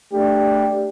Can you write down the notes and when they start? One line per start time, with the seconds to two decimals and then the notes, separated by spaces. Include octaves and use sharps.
0.13 A3 D4 G4